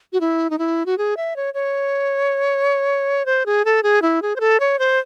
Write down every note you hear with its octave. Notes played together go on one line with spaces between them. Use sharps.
F#4
E4
D#4
E4
F#4
G#4
E5
C#5
C#5
C5
G#4
A4
G#4
E4
G#4
C5
A4
C#5
C5